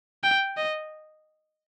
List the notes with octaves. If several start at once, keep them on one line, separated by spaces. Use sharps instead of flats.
G5
D#5